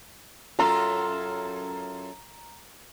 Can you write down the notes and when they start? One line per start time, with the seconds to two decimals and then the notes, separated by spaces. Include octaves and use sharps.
0.59 F#2 F4 A4 A#5